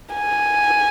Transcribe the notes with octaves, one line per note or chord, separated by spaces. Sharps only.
G#5